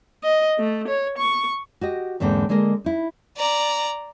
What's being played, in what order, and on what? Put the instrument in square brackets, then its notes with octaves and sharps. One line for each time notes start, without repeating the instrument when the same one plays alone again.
[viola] D#5
A3
C#5
C#6
[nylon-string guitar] F#4 G4 D#5
E2 G#2 D3 A#3 C4
D3 G#3 A#3 A#4 D#5
D#4 E4
[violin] D5 A#5